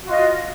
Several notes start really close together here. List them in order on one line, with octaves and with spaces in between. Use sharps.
F#4 F4 D#5